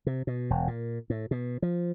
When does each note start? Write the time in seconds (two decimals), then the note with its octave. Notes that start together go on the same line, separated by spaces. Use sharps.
0.06 C3
0.27 B2
0.50 E1
0.67 A#2
1.10 A2
1.31 B2
1.62 F3